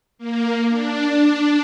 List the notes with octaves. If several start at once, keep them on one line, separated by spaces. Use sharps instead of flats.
A#3
D4